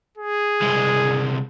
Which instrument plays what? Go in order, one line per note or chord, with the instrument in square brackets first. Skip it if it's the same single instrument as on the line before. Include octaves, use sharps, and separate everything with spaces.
[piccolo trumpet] G#4
[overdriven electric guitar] C2 G#3